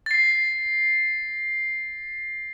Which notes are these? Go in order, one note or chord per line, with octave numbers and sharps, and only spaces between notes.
A6 C7